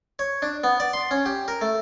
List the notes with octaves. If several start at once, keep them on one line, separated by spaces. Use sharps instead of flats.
C#5
D4
B3
D5
C6
C#4
G4
A#4
A3